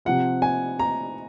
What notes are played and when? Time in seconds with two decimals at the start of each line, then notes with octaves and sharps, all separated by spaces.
0.05 C3 F3 C4 F#5
0.42 G#5
0.79 A#5